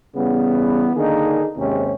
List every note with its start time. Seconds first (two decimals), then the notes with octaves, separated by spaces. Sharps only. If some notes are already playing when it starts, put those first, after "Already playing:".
0.16 C#3 E3 G3 B3
0.95 D3 D#3 A#3 D4 D#4 G#4
1.57 D#2 G#2 C3 G#3 C4 C#4